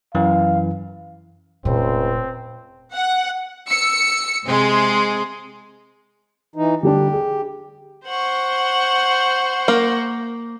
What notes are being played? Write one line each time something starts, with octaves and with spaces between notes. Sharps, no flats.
F#2 E3 F5
F1 C#2 A#2 C4
F#5
E6 C#7
C3 G#3 G#4 C6
E3 D#4
D3 G3 D4 G4
G#4
C5 F#5 C#6
A#3